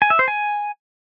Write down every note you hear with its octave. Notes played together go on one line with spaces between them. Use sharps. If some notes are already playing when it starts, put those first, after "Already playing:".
G#5
E5
C5
G#5